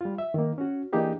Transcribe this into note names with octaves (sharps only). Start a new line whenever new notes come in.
G3 F4
E5
D#3 A#3
C#4 F#4
E3 A#3 D4 D#4 G4 G#4